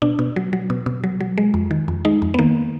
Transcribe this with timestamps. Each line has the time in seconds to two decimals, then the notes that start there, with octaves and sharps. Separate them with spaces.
0.02 B2 D4
0.19 B2
0.36 F#3
0.53 F#3
0.70 B2
0.86 B2
1.04 F#3
1.21 F#3
1.38 G#3
1.54 F2
1.71 D#3
1.88 F2
2.05 G#3 D#4
2.22 F2
2.34 B3
2.39 D#3 A#3